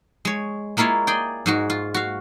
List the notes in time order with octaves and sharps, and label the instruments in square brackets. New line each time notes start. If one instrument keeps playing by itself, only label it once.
[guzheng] G#3 C#5
G#3 A#3 E4 F4 C#5
G#4 D5 G5
G#2 G#3 F#4
F4
F#4 F5